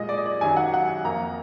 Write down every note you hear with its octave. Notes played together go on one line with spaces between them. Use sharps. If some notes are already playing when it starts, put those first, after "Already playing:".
Already playing: A#2 G#3 D#5
D5
D#5
D5
F#2 D#3 F#3 G#5
F#5
F#5
F2 F3 A#3 A#5